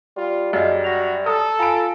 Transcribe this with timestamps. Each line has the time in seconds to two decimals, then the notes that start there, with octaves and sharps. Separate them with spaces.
0.17 G3 F4
0.53 F#2 G#4 D#5 F5
0.84 F#4 A#6 F7
1.26 A4 A#5 D#6
1.59 F4 G#5 A#5 B5 D7